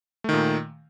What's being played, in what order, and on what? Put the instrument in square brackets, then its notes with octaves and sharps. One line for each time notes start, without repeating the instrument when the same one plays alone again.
[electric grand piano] A3
D#3
A#2